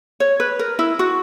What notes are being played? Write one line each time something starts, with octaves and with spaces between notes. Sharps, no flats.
C#5
B4
A#4
E4
F#4